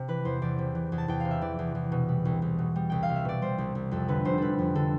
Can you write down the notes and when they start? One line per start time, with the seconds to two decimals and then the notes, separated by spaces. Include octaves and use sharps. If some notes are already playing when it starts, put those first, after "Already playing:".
Already playing: C3
0.08 E3 B4
0.25 E2 C5
0.42 E2 D5
0.59 C3
0.75 E3
0.92 E2
0.98 A5
1.08 E2 G5
1.20 C3 F5
1.31 E5
1.41 E3 D5
1.59 E2
1.75 E2
1.92 B2
2.09 G3
2.25 C2
2.42 C2
2.59 B2
2.76 G3
2.90 C2 G5
3.03 F5
3.09 C2
3.16 E5
3.25 B2 D5
3.42 G3 C5
3.58 C2
3.75 C2
3.91 F2 A4
4.08 D3 B4
4.25 F1 C5
4.38 G3 A4 B4
4.59 F2
4.75 D3 A4